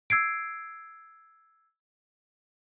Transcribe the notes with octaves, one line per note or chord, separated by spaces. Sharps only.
E6 G#6 C7 D7